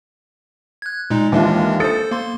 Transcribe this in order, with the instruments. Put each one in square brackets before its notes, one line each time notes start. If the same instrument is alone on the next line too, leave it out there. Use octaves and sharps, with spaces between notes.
[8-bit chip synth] F#6 G#6
A#2 G#3 D#4
[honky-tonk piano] D#2 E4 F4 [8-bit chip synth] E3 G#3 D4
[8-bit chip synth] A4 C5 [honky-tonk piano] D#6 A6 C#7
[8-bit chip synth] A#3 C6